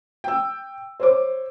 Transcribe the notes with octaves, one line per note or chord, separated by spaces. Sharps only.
G5 E6
C5 C#5 D6